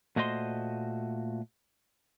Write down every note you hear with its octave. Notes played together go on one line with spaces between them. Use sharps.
A#2 A3 F#4 C5 D#5 C6